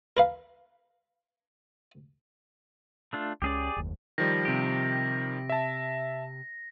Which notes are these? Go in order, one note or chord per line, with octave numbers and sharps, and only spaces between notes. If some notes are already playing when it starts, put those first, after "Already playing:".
A#4 B4 F5
A3 D4 F4
C#2 F3 C#4 G4 G#4 D5
F#1 D#2
D#3 F3 G3 A#6
C3 G4
E5 A5